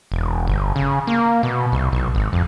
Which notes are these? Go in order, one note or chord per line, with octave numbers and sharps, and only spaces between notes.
E1
G1
C#3
A#3
B2
C2
B1
G#1
F2